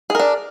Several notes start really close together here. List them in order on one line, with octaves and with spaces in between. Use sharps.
G#4 A#4 D4